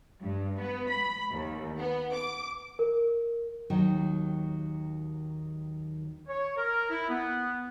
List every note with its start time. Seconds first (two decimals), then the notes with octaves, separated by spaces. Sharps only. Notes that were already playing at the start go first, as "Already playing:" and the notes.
0.21 G2
0.60 B3
0.90 B5
1.31 D#2
1.79 B3
2.14 D6
2.79 A#4
3.70 D#2 D#3 F#3
6.29 C#5
6.58 A#4
6.90 E4
7.10 B3